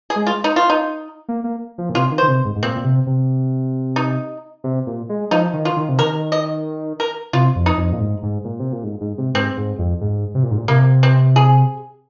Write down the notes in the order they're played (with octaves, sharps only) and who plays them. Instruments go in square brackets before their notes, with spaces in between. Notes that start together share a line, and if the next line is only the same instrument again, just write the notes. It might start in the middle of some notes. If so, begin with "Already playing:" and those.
[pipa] G#4
[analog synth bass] G#3
[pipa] F4
D#4
F4
D#4
[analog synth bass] A#3
A#3
F3
A#2
[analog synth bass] C3 [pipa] F4
[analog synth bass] D#3
[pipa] C5
[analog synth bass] D#3
C3
G#2
G#2
[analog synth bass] A#2 [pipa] C4
[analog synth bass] A#2
C3
C3
[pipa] D#4
[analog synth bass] C3
A#2
G#3
[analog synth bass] F3 [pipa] D#4
[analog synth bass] D#3
[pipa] F4
[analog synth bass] D#3
C3
[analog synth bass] D#3 [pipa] A#4
[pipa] D#5
A#4
[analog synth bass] C3 [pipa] F4
[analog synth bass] F2
[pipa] D#4
[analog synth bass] F2
A#2
G#2
G#2
A#2
C3
A#2
G#2
G#2
C3
[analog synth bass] G#2 [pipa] C4
[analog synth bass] G#2
F2
G#2
C3
A#2
G#2
A#2
[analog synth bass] C3 [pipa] A#3
[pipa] C4
G#4